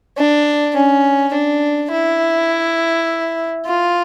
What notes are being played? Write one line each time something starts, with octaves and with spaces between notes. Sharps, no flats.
D4
C#4
D4
E4
F4